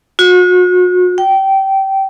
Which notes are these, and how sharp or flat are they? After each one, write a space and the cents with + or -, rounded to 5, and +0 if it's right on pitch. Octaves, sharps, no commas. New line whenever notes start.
F#4 -40
G5 -20